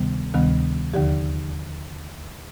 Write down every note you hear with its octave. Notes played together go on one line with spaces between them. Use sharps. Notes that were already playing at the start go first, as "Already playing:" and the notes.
Already playing: D2 C3 D#3 G3 B3
D2 C3 D#3 G3 B3
D#2 D3 F3 G4